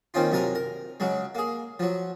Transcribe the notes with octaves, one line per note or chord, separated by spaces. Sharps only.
D#3 A#3 C4 C#4 D#4 F4
F#2 C3 A#4 G#5 A#5 D#6
A#4
C#3 F#3 G#3
A#3 G#4
F3 F#3